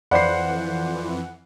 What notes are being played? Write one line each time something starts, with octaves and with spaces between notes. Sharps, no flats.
F2 E3 C5 D5 F5 F#5 B5 C7